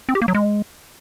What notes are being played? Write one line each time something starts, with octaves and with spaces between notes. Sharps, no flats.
C4
G4
A#3
F#3
G#3